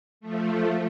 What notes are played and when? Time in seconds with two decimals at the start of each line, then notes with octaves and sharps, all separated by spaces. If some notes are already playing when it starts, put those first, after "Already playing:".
0.21 F3 A3